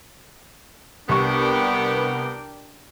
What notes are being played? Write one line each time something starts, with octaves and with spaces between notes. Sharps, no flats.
C2 B3 D4 A#4 G5 C#6